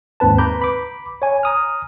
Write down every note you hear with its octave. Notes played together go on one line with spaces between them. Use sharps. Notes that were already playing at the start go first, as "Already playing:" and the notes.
D#2 G#2 C4 B4 A5
B4 A#5 B5 D6 G6
B5 D6
C#5 G#5
A#5 D#6 F6